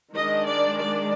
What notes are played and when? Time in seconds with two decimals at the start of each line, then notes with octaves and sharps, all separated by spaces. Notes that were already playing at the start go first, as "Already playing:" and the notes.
0.14 D#3 G#3 D4 D#5
0.46 D5
0.78 D5